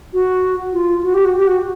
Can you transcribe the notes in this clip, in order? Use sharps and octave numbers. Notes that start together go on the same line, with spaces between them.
F#4
F4
F#4
G4
F#4
G4
F#4